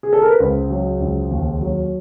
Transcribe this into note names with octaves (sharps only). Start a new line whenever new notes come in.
G#4
A4
A#4
B4
C#2 C5
F#3
C#2
D#2
F#3